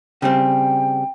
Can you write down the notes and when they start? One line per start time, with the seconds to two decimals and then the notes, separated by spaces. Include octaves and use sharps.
0.22 C#3 G3 C4 G5